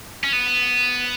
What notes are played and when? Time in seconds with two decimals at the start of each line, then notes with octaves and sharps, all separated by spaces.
0.24 C#4
0.33 B3